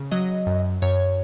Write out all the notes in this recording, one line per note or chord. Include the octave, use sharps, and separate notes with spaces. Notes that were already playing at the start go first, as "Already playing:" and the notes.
Already playing: C#3
F#3 D#5
F#2
F#2 C#5